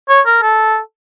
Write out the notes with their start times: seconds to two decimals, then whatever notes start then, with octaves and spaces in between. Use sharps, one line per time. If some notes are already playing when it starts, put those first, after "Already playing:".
0.09 C#5
0.26 A#4
0.43 A4